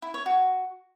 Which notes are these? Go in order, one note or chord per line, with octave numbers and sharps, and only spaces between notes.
E4
C#5
F#4